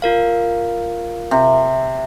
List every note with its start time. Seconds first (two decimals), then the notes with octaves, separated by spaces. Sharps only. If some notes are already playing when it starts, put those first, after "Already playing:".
0.02 F4 A#4 F5
1.31 C3